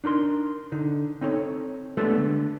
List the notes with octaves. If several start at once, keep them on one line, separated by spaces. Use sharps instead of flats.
D4 D#4 A#4 C6
D3 D#4
C4 D#4 A4 C#5
G#3 A3 B3 D4 G4 A4
D3